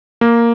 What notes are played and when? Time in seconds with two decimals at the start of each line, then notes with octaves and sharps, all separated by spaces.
0.21 A#3